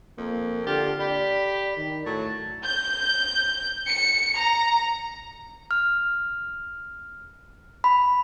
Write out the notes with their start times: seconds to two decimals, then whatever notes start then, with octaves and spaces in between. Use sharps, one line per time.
0.18 F2 A#3
0.66 D3 F4 G4
1.00 G4 D5 B5
1.77 D#3
2.06 A2 F#3 A4
2.65 G6
3.88 C#7
4.36 A#5
5.71 F6
7.84 B5